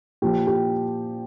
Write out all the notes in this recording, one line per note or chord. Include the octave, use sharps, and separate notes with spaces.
A#2 F3 G4
G4